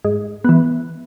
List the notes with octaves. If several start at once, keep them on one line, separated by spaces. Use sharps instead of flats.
G#2
E3 B3